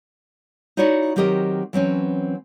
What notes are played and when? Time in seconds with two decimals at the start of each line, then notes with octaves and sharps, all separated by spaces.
0.77 D#4 E4 F#4 C#5 D5 E5
1.16 D#3 F#3 C4 G4 A#4 D#5
1.73 E3 F#3 C4 C#4